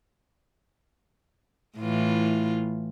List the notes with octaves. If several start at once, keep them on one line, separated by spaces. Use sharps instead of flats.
A2 E3 F4